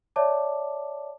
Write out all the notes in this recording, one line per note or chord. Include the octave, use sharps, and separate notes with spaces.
C#5 D5 E5 A5 D6